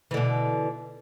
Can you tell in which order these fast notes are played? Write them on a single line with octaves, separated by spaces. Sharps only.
E3 D3 B2